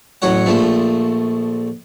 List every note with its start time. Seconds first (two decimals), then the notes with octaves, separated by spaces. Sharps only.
0.22 A1 F#3 C#5 F#5
0.46 A#1 F3 A3